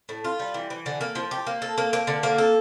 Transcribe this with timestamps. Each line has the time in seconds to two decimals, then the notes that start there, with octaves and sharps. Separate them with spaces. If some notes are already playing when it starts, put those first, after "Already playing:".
0.09 A2
0.24 F4
0.40 G3
0.54 E3
0.70 E3
0.86 D3
1.01 A#3
1.15 F3
1.31 G4
1.47 A#3
1.62 A4
1.78 A#3
1.93 A#3
2.07 D3
2.23 A#3
2.38 A4